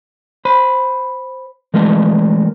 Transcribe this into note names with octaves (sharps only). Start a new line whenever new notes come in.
C5 B5
E3 G#3 A3 A#4